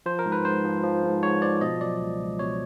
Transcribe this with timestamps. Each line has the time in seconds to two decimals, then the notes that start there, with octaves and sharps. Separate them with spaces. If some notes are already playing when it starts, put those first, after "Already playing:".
0.06 F3 C5
0.19 A#4
0.26 G#2
0.32 B4
0.44 G#2 C5
0.64 F3
0.84 F3
1.03 G#2
1.23 G#2 C#5
1.42 F3 D5
1.61 B2 D#5
1.81 F#3 D5
2.00 C#2
2.20 C#2
2.39 B2 C#5